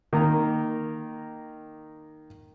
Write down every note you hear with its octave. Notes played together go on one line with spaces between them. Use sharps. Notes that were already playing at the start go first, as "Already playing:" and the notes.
D#3 A#3 A#5